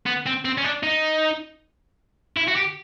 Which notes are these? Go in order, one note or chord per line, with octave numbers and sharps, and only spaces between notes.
B3
C4
C4
C#4
D4
D#4
E4
F#4
G4